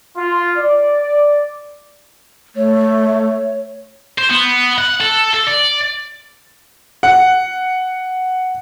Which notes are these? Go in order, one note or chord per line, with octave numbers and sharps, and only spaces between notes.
F4
D5
A3 C#5
C5
B3
F#5
A4
A4
D5
F#5